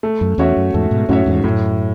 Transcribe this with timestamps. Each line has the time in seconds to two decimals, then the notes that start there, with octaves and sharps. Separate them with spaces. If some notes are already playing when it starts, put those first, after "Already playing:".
0.03 A3
0.21 F#2
0.38 E2 C#4 F#4 C#5 E5
0.57 F#2
0.74 E2 G#2 A3
0.91 G#2 B2
1.09 F#2 A2 C#4 F#4 C#5 E5
1.26 E2 G#2
1.44 F#2 A2